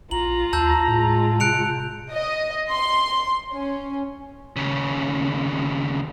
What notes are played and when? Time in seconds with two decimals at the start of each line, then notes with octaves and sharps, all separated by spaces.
0.11 A#1 F4 A#5 F#7
0.53 D#2 A5 E6 G6
0.88 A2 G#3 F4
1.40 C3 F#6 C#7 D7 F7
2.12 D#5
2.71 C6
3.54 C#4
4.56 D#2 C#3